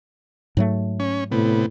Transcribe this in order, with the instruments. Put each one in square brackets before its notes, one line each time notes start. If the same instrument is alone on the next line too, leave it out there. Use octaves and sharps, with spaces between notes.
[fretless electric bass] G#2 F#3 A3
[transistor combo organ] C#4
[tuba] A2 [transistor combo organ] C3 B3